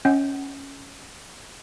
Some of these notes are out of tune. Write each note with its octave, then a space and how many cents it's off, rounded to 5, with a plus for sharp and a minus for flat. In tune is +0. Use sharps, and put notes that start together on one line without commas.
C#4 +0 D#5 +35 F#5 +25